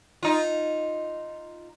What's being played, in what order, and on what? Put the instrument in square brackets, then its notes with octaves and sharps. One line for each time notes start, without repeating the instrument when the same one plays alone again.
[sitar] D#4 F4